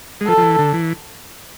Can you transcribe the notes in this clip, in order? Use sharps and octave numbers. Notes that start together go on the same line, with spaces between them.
G#3
F3 A4
F3
E3
D3
E3